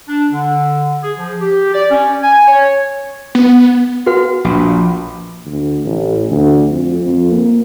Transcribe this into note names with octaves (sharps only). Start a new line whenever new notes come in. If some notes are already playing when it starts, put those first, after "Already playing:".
D4
D3
G#4
F3
G4
D5
C#4
G#5
C#5
B3
F#4 B4 F#5
A#1
D2
A1
D2
F2
F2
A#3